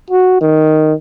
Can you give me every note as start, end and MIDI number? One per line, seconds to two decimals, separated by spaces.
0.10 0.37 66
0.41 0.94 51